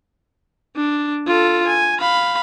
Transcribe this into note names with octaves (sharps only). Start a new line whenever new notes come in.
D4
F4 A4
G#5
F5 B5